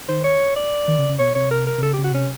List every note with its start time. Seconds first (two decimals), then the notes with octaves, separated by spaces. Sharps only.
0.08 D#3 C5
0.24 C#5
0.56 D5
0.88 D#3
0.98 C#3
1.09 C#3
1.19 B2 C#5
1.35 C3 C#5
1.51 A#4
1.67 A#4
1.78 C3
1.82 C#3 A4
1.94 C#3 G4
2.04 F#4
2.12 C3 C#4